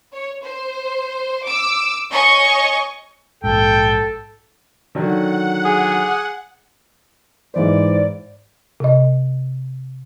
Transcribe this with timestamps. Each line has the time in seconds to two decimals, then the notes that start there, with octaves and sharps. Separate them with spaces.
0.13 C#5
0.43 C5
1.45 D6 E6
2.11 C#5 D#5 G#5 C#6
3.44 A#1 G#2 A4 G5
4.95 D3 D#3 F#3 F#5
5.65 G#4
7.54 G#2 E3 C5 D5
8.80 C3 D#5